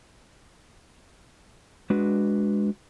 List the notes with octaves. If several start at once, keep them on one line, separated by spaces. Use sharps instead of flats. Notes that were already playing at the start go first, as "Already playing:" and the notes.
G#3 D4 F#4 B4